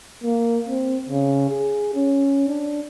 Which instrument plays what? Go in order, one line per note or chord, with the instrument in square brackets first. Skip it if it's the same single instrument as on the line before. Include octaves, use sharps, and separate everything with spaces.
[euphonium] A#3
C4
C#3
G#4
C#4
D4